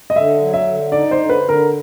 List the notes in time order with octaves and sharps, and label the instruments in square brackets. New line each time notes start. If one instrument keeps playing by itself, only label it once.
[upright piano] D#5
[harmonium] D3 [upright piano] E5
[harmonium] F#3
[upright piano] E5
[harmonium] D3
[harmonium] D#4 [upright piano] D5
[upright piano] C5
[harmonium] D3
[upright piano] B4
[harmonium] D3
[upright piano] A#4